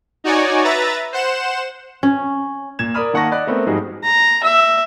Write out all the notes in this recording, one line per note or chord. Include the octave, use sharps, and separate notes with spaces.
D#4 F#4 C#5 D5 G#5
B4 E5 A#5 A6
C5 F#5 E7
C#4
A#2 G#6 E7
A#4 D5 B5 D#6 F6
D#3 A#3 F#5 A5 C#6 A#6
D5 D#5 B5 F#6
A3 B3 C4 A#4
G#2 F3 G3 D#4 F#4 G#4
A#5
E5